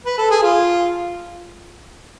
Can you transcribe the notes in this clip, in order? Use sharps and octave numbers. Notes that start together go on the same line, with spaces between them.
B4
A4
G#4
F4